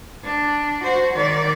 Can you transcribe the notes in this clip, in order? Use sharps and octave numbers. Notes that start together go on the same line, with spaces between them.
D4
F#4 C5
D#3 D5